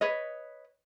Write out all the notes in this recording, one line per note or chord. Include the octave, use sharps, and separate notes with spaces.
B4 C#5 D#5